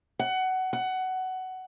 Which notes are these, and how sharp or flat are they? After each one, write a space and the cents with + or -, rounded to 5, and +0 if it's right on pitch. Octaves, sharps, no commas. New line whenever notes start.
F#5 +20
F#5 +15